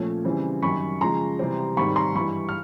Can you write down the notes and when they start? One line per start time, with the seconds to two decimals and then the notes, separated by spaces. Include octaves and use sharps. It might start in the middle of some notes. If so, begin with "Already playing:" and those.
Already playing: A#2 F3 A3 C#4
0.25 C#3 E3 G3 C4
0.62 F#2 D#3 G3 B5 C#6
1.01 C#3 F3 G#3 A#5 C6
1.39 C3 E3 G3 C4
1.77 G#2 D#3 G3 C4 B5 C#6
1.96 A#5 C6
2.15 G2 E3 G3 B5 C#6
2.49 F6